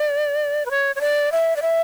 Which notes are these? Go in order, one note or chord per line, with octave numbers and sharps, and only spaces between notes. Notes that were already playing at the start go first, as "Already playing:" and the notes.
Already playing: D5
B4
C#5
C#5
D5
E5
D5
E5